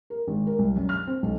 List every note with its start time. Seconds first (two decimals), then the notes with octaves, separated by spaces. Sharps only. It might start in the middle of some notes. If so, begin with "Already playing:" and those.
0.10 A#4
0.28 G#1
0.47 A#4
0.59 C2
0.76 F#2
0.89 F6
1.07 C4
1.23 B1